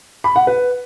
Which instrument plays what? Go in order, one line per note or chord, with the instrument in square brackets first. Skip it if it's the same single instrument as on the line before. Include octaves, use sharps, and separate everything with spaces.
[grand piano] B5
F#5
B4